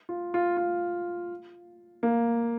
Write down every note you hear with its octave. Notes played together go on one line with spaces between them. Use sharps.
F4
F4
F4
A#3